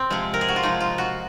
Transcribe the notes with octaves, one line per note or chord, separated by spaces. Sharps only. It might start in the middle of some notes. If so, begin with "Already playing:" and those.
Already playing: C4
C3 F3 G#3
A#4
G#4
F#4
F4
C3 F3 G#3 D#4
F4
F#4